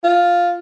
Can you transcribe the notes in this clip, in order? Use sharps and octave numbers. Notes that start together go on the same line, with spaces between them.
F4